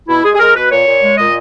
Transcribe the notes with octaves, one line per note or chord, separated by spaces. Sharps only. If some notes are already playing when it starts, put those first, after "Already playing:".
B2 E4
G#3 G#4
G#4
G#3 A#4
B2 B4
A#2 C#5
A#2
G#3
A#2 D#5